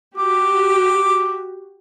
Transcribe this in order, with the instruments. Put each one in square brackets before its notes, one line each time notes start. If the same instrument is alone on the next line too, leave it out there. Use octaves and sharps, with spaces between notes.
[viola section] F#4 G4 [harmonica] D6